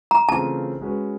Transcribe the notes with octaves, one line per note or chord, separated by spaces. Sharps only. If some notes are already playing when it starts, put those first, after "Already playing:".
A#5
C#3 E3 A3 C4 F4 A5
G#3 C#4 F#4 B4